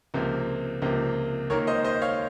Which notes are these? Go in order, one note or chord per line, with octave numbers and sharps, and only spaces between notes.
C#2 C3 F3 A#3
C#2 C3 F3 A#3
D#2 D#3 A#3 A#4 C#5
C5 D#5
C5 D#5
C#5 F5